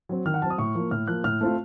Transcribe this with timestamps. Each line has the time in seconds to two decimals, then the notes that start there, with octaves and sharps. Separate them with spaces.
0.09 F#3 C4
0.26 D#3 F6
0.34 F#5
0.42 F#3 A5
0.46 C4 D#6
0.58 A2 C#6
0.75 F3 A#3
0.91 A2 F6
1.07 F3 A#3 F#6
1.24 A2 F6
1.41 A3 C4 F4